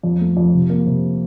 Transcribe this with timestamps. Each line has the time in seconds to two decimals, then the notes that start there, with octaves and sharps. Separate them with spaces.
0.03 F2
0.21 A3
0.37 F2
0.54 C3
0.70 A#3
0.86 C3